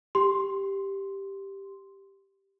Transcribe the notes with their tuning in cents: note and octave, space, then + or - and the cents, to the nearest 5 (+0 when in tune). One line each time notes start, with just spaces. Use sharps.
G4 +0 C6 +0